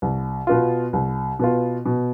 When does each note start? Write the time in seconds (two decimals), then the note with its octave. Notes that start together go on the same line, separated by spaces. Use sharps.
0.02 C2
0.47 B2 B3 F4
0.93 C2
1.39 B2 B3 F4
1.86 B2